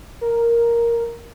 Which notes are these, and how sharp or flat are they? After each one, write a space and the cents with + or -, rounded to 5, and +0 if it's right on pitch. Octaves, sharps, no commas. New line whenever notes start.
A#4 +0